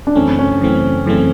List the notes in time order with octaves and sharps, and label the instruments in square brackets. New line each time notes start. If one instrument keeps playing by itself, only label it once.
[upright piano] D4
[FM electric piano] F#2 C#3 E3 A3 C4 [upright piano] C#4
[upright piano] C#4
[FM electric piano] F#2 C#3 E3 A3 C4
F#2 C#3 E3 A3 C4